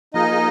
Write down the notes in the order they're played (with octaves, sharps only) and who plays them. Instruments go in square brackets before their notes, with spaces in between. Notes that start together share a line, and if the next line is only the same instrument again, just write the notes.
[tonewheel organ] F3 A#3 F4 G#4 [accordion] D#4 D#5